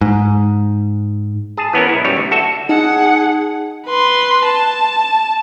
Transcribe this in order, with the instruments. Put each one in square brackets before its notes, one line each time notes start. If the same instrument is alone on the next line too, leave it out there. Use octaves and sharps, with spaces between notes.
[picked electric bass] G#2
[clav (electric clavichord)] G#4 A5
E3 B3 C#4 A#4
B1 E4
F#2 G3 C#5
D2
F#4 A4 E5
[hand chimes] D#4 [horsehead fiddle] G#4 F#5
[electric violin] B4 C6
A5